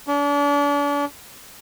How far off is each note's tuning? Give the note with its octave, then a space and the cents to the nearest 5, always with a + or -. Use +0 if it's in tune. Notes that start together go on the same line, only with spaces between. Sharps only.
D4 -40